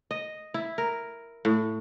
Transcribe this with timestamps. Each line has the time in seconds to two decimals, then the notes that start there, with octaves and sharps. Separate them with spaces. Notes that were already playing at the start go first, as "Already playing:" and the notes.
0.11 D#5
0.54 E4
0.78 A#4
1.45 A2